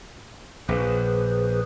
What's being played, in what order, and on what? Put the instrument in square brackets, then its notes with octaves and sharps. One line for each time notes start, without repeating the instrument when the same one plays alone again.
[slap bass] A#1 [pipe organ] G#4 B4 C5